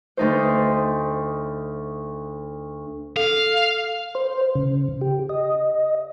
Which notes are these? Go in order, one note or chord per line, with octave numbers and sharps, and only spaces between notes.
D2 D#4 C5
A4 F5
C5
C#3
G4
D#5